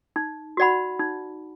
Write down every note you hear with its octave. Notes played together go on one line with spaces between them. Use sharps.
D#4
F#4 D5 F#5 B5
D#4